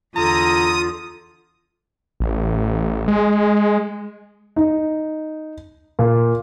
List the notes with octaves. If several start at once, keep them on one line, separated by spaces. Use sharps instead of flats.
E2 D3 F4 A#5 D#6
A1
G#3
D#4
A#2